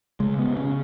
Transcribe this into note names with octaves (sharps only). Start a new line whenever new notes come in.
C#3 G#3
B3
C#3
C#4